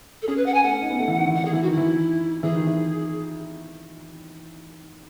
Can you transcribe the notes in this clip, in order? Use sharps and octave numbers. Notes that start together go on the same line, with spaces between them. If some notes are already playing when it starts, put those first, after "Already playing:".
A4
C#4 G#4
B4
F#5
G#5
A3 F#5
C#4
D#4
B3
A3
E3
D#3
E3
D#3 F#5
G#4
E3 E4
F#4
D#3
E4
E3
E3 G#4
D#3
E3